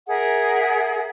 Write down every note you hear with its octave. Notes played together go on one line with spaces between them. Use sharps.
G#4 A#4 E5 F#5